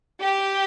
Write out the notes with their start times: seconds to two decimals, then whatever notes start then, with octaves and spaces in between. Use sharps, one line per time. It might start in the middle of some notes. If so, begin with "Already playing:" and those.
0.20 G4